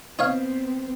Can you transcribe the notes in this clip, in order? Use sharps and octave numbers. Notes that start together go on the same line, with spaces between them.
B3 C4 D#4 C#5 F5